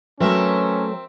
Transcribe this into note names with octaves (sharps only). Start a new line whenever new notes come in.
F#3 A3 C4 C#4 A#4 B4 E5